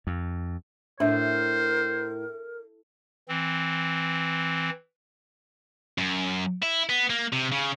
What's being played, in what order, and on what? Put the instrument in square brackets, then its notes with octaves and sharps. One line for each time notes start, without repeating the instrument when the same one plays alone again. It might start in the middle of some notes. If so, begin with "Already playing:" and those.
[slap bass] F2
[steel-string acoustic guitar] A2 [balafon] D4 E5 [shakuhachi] A#4 [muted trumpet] C5
[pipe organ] E3 C4
[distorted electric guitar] F#2
E4
B3
A#3
C3
C#3